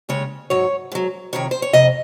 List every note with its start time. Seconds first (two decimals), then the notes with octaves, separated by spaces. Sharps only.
0.09 D#2 C#3 G#3 C#5
0.50 G#2 F#3 C#5
0.92 G#2 F#3
1.33 F2 C3 D#3 C#5
1.51 C5
1.62 C#5
1.73 F2 C3 D#5